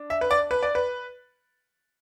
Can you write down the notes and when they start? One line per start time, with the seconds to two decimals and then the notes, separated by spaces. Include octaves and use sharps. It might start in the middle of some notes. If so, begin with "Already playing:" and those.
Already playing: D4
0.10 E5
0.21 B4
0.31 D5
0.51 B4
0.63 D5
0.75 B4